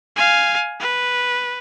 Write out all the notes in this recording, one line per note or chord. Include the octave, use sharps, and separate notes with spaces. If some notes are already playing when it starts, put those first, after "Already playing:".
F5 G#5
B4